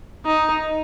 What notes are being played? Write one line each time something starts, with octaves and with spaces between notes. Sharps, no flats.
D#4